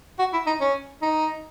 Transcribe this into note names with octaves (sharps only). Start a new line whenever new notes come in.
F#4
E4
D#4
C#4
D#4